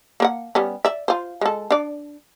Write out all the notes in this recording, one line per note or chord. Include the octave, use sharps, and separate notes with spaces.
A#3 A#4 F#5
G3 B3 C#4
D5 E5
F4 C5
G#3 A4
D4 D5